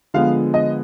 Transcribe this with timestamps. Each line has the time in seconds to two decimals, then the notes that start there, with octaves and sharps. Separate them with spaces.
0.14 D3 F3 G#3 B3 F5
0.54 D#5